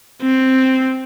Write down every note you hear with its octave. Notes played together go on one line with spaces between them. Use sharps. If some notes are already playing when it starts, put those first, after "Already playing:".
C4